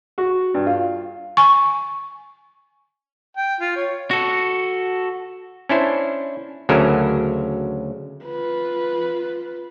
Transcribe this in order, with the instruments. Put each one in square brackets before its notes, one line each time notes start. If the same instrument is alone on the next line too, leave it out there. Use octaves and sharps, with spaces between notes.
[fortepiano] F#4
G2
F4
[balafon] G#5 C#6
[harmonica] G5
F4
C#5
[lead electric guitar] F#4 A4
[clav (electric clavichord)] C#4 D4 E4 C5
D2 C#3 F#3 A4 A#4 G#5
[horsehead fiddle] F4 B4